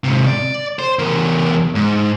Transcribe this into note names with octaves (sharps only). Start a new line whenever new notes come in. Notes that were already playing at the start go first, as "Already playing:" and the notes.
G#2 C3
D5
C5
E2 A#4
G#2